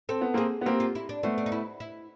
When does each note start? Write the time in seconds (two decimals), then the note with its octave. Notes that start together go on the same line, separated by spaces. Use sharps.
0.09 C4 A4
0.21 B3
0.34 A#3 C4 G#4
0.61 B3
0.66 A#3 C4 G4
0.80 F4
0.95 E4
1.09 D4
1.23 A3 B3 C4
1.38 C4
1.46 D#4
1.52 E4
1.80 E4